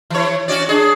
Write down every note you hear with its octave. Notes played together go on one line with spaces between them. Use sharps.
E3 C#5
C#4 F#4 D5
D4 G#4